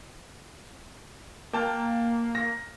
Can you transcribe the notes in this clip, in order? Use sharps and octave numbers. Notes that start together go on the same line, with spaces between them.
A#3 G5 A5 F6
A#6